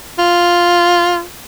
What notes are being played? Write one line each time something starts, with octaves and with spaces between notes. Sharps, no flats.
F4